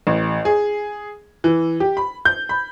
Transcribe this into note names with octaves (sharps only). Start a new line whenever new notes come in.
A1
G#4
E3
G4
B5
G6
B5